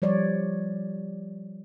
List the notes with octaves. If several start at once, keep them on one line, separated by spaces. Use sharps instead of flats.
F3 G3 C#5 D5